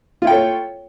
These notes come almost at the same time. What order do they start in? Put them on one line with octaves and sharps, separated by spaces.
F4 E4 G5 A4 C#5